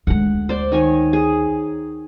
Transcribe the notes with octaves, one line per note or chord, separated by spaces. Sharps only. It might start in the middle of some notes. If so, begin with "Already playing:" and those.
D2 G#3 F#5
C5 D5
D#3 C#5 G#5
G#4